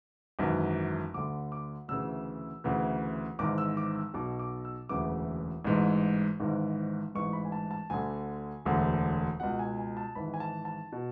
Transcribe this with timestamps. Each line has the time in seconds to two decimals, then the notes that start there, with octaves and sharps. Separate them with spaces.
0.39 G#1 F#2 E3
1.14 D2 D3 D6
1.52 D6
1.88 D2 C#3 E3 E6
2.64 D2 C#3 E3
3.39 G#1 G#2 E3 D6
3.58 E6
3.77 D6
3.95 E6
4.14 B1 B2 D6
4.39 D6
4.65 E6
4.89 E1 D2 C#3 E3 D6
5.65 A1 G#2 E3
6.40 G#1 G#2 E3
7.14 A1 G#2 E3 C#6
7.33 B5
7.45 G#5
7.52 A5
7.71 A5
7.90 D2 D3 G#5
8.65 E1 D2 D3
9.40 C#2 B2 F#5
9.59 G#5
9.78 G#5
9.97 A5
10.15 G#1 G#2 E3 B5
10.34 G#5
10.40 A5
10.65 A5
10.92 B2